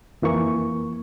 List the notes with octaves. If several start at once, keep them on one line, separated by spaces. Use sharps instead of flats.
F2 E3 A#3 C#6